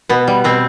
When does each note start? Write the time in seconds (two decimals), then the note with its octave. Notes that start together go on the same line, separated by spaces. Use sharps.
0.09 B2 B3
0.27 G3
0.44 B2 C4